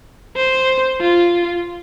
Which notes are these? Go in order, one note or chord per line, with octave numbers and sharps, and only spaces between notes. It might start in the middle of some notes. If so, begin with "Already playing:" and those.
C5
F4